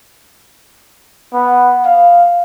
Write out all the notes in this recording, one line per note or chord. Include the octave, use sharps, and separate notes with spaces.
B3
F5